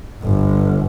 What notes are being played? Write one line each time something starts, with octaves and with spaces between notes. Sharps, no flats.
G1